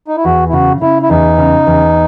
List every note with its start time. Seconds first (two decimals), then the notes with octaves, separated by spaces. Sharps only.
0.08 D#4
0.17 E4
0.25 E2 F#4
0.49 E4
0.53 C#3 F#4
0.81 C#3 E4
1.02 E4
1.10 E2 D#4
1.38 C#3
1.67 E2